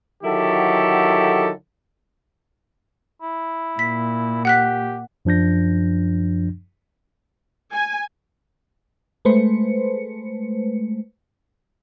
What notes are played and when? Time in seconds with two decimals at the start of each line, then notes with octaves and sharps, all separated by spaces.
0.23 D3 D#3 F#3 E4 G4 A4
3.22 E4
3.79 A#2 B6
4.45 G4 F#5 F#6 B6
5.25 F#2 F3 D4 G6 A#6
7.72 G#5
9.25 G#3 A3 B4 C5 C#7